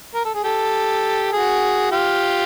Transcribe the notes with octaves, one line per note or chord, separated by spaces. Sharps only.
A#4
A4
G#4
G4 A4
F#4 G#4
F4 G4